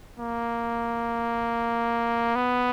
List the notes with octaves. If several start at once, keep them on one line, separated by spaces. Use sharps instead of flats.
A#3
B3